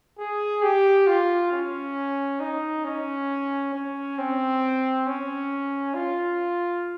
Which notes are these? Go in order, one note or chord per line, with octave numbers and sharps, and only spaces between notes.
G#4
G4
F4
C#4
D#4
C#4
C#4
C4
C#4
F4